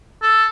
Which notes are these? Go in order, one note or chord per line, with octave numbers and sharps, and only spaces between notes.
A4